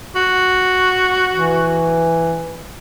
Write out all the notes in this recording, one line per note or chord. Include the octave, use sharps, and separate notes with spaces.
F#4
E3